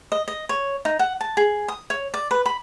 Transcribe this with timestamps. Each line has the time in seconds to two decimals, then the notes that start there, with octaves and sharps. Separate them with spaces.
0.12 D#5
0.28 D#5
0.49 C#5
0.85 D#4
0.99 F#5
1.21 A5
1.37 G#4
1.68 D#6
1.90 C#5
2.14 D5
2.31 B4
2.46 B5